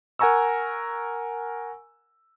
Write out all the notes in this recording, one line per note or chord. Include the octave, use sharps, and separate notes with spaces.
A#4 F#5 G#5 A#5 C#6 E6